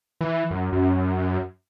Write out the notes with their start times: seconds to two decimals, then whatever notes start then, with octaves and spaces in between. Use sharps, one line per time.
0.21 E3
0.51 F#2
0.73 F#2